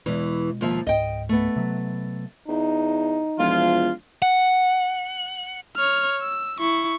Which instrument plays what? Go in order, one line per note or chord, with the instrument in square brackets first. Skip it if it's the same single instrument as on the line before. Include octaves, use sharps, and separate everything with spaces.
[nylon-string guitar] E2 E3 [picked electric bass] B2 G#3
[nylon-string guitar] D#2 F3 E5
[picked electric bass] C#2 G#2 [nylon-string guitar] D#5 G5
[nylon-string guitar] A3 B3
[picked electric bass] C3 F#3
[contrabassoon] E2 [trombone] D#4
[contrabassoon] E1 [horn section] F3 F4
[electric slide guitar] F#5
[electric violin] C#5 F6
E6
E4 C#6